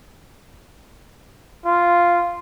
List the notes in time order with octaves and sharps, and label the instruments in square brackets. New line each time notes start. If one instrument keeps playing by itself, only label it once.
[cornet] F4